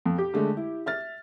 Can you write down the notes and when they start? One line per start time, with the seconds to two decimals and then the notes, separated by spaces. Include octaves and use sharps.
0.06 F2
0.18 G4
0.34 D3 G#3 A3
0.57 E4
0.86 E5 F6 A6